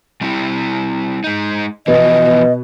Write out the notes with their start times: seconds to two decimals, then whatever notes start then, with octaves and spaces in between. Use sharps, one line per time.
0.21 G3 C4 E4
1.24 G#3 D#4
1.87 B2 E3 F3 B3 D#5